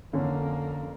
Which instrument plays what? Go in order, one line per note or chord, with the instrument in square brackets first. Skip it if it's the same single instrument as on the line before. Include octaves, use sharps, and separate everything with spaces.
[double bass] F2 A#3 [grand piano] D3 C#4